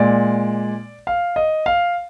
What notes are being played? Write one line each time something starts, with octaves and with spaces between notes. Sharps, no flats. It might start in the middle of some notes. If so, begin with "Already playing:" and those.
Already playing: A#2 G#3 D5
F5
D#5
F5